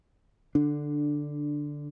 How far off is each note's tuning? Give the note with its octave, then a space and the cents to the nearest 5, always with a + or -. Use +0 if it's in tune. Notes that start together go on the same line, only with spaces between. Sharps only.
D3 +0 D4 +10